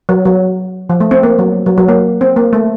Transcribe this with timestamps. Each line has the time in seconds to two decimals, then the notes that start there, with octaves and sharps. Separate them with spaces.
0.09 F#3
0.25 F#3
0.89 F3
1.00 A3
1.11 C4
1.23 A#3
1.39 F#3
1.66 F#3
1.78 F#3
1.88 A#3
2.21 C4
2.36 A#3
2.53 A3